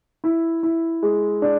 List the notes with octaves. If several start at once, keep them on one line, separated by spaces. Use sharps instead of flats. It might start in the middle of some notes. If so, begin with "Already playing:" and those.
E4
E4
G#3
D4